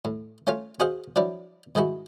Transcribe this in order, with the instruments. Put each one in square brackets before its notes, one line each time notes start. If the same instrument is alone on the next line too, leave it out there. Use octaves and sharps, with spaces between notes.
[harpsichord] A2
A3 C#4 F4 C#5 F5
F#4 G#4 C5 D#5 F5 F#5
F3 F#3 D4 E4 D5
G#2 D#3 G#3 E4 F#4